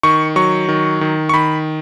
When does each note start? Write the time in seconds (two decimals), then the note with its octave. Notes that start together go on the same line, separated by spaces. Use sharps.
0.03 D#3 C#6
0.36 F#3 C#6
0.68 D#3
1.01 D#3
1.29 C#6
1.33 D#3 B5